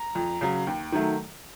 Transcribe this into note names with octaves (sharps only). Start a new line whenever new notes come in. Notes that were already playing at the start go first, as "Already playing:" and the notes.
Already playing: A#5
F2
C#3 F#3
D#2
D#3 F#3 A3